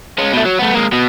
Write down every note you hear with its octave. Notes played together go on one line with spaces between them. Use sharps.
G#3 C#4
B2 A3
F#3
A3 B3
G#3 A#3
B2